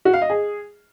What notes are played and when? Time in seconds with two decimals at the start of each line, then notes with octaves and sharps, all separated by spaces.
0.05 F#4
0.13 F5
0.22 D#5
0.30 G#4